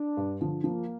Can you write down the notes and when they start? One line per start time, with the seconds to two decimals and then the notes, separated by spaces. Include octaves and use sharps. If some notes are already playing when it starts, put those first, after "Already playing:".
Already playing: D4
0.17 G2
0.41 D3 F3
0.64 F3 A#3